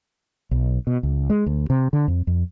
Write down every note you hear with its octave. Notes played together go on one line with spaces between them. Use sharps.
B1
B2
C#2
G#3
D2
C3
D3
F2
F2